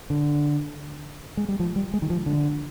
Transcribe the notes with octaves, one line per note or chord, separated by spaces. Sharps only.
D3
G#3
G3
F3
G3
G#3
D#3
F3
D3